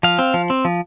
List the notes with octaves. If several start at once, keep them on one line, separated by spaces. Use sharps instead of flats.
F3 F5
C4
F3
C4
F3